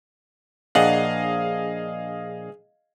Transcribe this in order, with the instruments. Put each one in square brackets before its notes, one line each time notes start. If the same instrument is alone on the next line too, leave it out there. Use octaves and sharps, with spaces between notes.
[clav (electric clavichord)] A#1 D4 F#5 [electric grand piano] G#4 D#5 F5